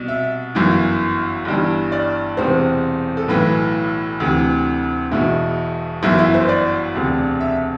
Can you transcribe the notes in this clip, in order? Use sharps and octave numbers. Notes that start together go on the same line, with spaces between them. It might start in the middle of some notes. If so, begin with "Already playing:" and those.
Already playing: C2 B2
E5
G1 F#2 E3
G1 G2 E3
D5
E1 E2 C3 C5
A4
B1 A2 E3 B4
D2 C3 E3
E1 E2 B2 E4
G1 F#2 E3 E4
E4
C5
D5
E1 D2 C3
E5